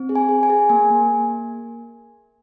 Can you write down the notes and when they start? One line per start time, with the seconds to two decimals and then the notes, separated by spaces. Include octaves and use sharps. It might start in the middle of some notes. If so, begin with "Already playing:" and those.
Already playing: C4
0.09 G#4
0.15 G#5
0.29 G#4
0.43 G#5
0.50 G#4
0.69 A#3 G#5
0.90 A#3
1.10 A#3